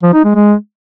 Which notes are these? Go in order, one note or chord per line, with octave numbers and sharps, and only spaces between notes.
F3
D#4
G#3
G#3